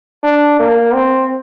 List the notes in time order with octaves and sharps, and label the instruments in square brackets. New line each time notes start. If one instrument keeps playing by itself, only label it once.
[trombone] D4
A#3
C4